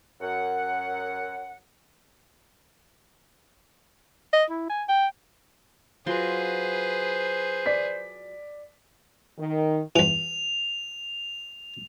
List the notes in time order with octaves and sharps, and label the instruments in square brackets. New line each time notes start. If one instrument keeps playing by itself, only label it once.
[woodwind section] F#2 F#5
[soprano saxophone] D#5
E4
G#5
G5
[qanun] F#3 F4 C6 [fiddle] G#4 B4 [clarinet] C5
[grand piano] D5 B6
[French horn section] D#3
[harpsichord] E2 E3 [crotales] F7